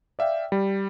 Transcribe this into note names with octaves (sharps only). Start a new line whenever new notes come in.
D5 E5 F5 G5
G3